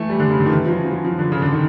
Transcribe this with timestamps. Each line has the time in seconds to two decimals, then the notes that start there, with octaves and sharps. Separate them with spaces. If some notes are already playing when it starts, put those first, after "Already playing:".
Already playing: E3 A3
0.10 G3
0.20 D3
0.30 C#3
0.40 D3
0.46 D#3
0.50 E3
0.65 F3
0.70 F#3
0.85 F3
0.91 F#3
1.05 F3
1.19 D3
1.32 C#3
1.42 D3
1.52 D#3